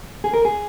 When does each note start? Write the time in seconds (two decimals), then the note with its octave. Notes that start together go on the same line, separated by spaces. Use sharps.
0.24 G#4
0.33 A#4
0.45 G#4